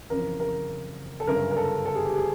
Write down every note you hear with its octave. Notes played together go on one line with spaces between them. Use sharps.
F#1 F2 C#3 E3 A#4
A#4
A4
G1 F#2 C#3 A#4
A#4
A4
A4
G#4
G4
G#4